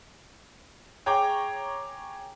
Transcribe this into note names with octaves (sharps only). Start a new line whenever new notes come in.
G#4 C#5 G5 A#5 D6